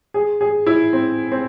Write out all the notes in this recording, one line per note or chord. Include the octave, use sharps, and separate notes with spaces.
G#4
G#4
E4
C4
C4